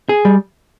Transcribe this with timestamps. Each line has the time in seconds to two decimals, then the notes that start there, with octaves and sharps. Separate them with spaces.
0.09 G#4
0.25 G3